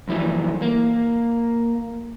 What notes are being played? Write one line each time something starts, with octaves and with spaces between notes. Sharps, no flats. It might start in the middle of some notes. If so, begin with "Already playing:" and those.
B1 F#2 E3 F3 G3
A#3